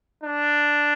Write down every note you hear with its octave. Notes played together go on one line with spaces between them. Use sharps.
D4